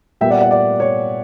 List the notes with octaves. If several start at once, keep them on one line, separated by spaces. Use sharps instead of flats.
A#2 G3 B3 E5 G5
D5 F#5
D5 F#5
D5
C#5